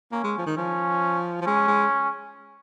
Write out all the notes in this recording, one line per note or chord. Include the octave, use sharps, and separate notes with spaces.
A#3 C#4
G#3
F3
D#3
F3 C#4
F3
G#3 C#4
G#3